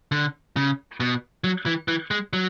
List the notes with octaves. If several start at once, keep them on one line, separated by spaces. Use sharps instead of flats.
D3
C#3
B2
F#3
E3
E3
G#3
F#3